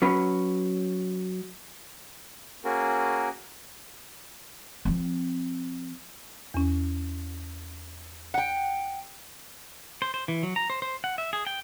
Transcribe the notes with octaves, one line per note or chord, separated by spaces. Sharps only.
F#3 C#4 B4
A#3 C#4 F#4 G#4 A#4
F3 C4
E2 C#4
F#5 G5
C5
C5
E3
F#3
A#5
C5
C5
F#5
E5
G#4
G5